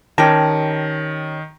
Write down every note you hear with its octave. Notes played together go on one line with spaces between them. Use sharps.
D#3 C#4 G4 A5 A#6